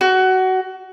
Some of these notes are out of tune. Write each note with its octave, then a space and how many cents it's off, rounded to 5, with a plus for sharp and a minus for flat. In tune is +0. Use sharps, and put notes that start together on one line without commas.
F#4 +20